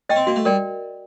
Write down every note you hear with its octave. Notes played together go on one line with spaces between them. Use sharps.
C#4 D#5 G5
C4
A#3 F#4
A3
G3 A#4 D5 G5